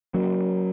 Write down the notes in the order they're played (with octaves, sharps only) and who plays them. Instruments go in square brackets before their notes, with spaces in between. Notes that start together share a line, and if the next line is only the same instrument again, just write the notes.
[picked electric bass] F#3 A#3 [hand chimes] C#4 F#4 A#4